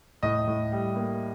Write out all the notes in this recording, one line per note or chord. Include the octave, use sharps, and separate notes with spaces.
A2 D#5
A2
G3
A#3